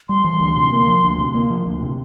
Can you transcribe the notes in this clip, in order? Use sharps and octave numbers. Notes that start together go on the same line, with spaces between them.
G3 C6
E3
D2
C3
A#3
F3
D2
C3
A#3
F3
D2
C3